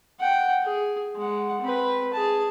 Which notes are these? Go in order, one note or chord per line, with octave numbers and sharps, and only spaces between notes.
F#5 G5
G#4
G#3 F#5
C4 B4
G#4 A5